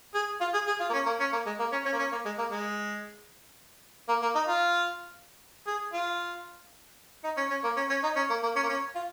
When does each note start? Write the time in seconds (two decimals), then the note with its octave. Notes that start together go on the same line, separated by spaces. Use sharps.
0.15 G#4
0.41 F4
0.54 G#4
0.67 G#4
0.80 F4
0.90 A#3
0.94 C#4
1.06 A#3
1.20 C#4
1.33 A#3
1.46 G#3
1.60 A#3
1.72 C#4
1.85 C#4
1.92 A#3
1.99 C#4
2.12 A#3
2.26 G#3
2.39 A#3
2.51 G#3
4.09 A#3
4.22 A#3
4.35 D#4
4.48 F4
5.67 G#4
5.93 F4
7.24 D#4
7.37 C#4
7.51 C#4
7.64 A#3
7.77 C#4
7.90 C#4
8.04 D#4
8.16 C#4
8.30 A#3
8.43 A#3
8.56 C#4
8.63 A#3
8.69 C#4
8.95 F4